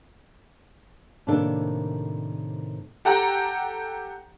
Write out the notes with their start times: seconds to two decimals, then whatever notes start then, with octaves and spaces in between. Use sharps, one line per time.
1.27 A2 C3 D#3 A#3 D4 A4
3.05 G4 A4 F#5 G5 A#5